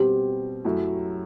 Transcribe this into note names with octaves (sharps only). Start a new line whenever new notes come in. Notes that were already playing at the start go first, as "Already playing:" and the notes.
Already playing: B2 G3 C4 G4
F#2 F#3 A3 E4